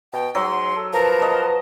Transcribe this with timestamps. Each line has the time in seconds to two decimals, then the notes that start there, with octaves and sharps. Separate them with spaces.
0.13 B2 G5
0.35 G#2 F#3 C6
0.76 A4
0.93 F3 A#4 B4 A5
1.22 D#5